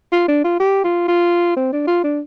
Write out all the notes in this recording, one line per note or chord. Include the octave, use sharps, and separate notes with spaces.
F4
D4
F4
G4
F4
F4
C4
D4
F4
D4